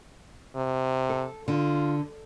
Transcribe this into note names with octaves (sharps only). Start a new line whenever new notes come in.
C3
A4
D3 F4